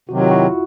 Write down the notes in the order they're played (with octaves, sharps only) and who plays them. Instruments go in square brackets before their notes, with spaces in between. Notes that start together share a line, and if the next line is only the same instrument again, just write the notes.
[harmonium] C3 D#3 F#3 [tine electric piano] F#4
[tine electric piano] F4
E4 F#4